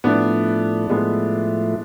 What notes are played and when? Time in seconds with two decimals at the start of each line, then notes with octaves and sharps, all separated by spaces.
0.04 A2 F3 A3 B3 D4 E4
0.90 A2 F3 G#3 A3 B3 E4